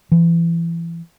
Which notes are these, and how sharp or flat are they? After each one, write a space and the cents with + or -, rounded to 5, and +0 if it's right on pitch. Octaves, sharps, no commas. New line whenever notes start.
E3 +30